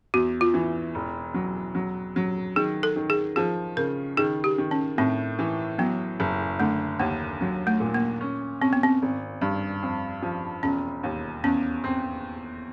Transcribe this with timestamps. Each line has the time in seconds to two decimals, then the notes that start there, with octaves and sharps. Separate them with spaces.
0.14 E2 F#4
0.41 F4
0.54 E3
0.95 E1
1.34 F#3
1.75 F#3
2.16 F#3
2.56 D#3 G#4
2.83 A4
2.96 D#3
3.10 G#4
3.36 F3 G#4
3.77 C#3 A#4
4.17 D#3 G#4
4.44 G4
4.58 D#3
4.71 C#4
4.98 A2 C4
5.39 E3
5.78 F#3 B3
6.20 F#1
6.60 D3 A3
7.00 D#2 A#3
7.41 F#3
7.67 A3
7.80 A#2
7.94 A#3
8.21 C#4
8.61 C4 C#4
8.73 B3
8.83 C4
9.02 G#1
9.41 G2
9.82 F2
10.22 F3
10.63 E1 C#4
11.03 D#2
11.44 E2 C#4
11.84 C4